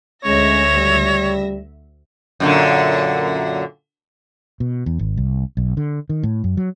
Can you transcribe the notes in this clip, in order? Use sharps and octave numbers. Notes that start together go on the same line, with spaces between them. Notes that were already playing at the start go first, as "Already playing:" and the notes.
D2 G#3 C#4 C#5 E5 A#6
C#2 G3
F#2 A#2 D3
B2
E2
G#1
C2
B1
D3
D#3
A2
F#2
F#3